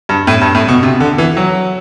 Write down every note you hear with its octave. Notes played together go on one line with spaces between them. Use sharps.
G2
A2
G2
A2
B2
C3
D3
E3
F#3